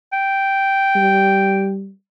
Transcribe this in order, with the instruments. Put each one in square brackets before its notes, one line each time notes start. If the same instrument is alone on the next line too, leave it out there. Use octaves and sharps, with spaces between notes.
[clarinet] G5
[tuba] G3